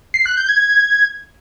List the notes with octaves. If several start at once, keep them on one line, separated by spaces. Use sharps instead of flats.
C7
F#6
G6
G#6